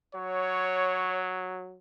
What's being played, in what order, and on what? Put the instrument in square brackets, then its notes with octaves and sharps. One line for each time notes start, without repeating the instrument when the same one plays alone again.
[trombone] F#3 [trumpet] C#5